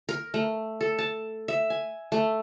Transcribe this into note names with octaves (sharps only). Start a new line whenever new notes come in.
A#4
A3
A4
A5
E5
G#5
A3